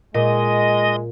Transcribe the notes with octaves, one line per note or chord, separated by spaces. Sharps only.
A#2 G#3 D#5